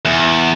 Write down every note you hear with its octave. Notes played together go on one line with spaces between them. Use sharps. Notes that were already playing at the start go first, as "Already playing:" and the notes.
E2